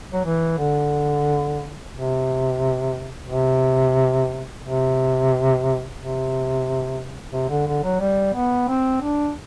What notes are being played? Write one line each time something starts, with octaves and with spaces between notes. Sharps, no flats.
F#3
E3
D3
C3
C3
C3
C3
C3
D3
D3
F#3
G3
B3
C4
D4